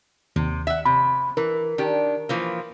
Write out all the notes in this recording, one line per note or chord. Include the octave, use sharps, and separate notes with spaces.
D#2 C3
E5 F#5
C3 B5
E3 A#4
D#3 D4 G4
E3 F3 A#3